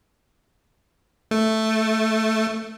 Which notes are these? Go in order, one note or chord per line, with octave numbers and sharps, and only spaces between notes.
A3